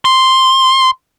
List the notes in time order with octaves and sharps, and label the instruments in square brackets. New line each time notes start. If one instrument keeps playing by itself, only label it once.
[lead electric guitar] C6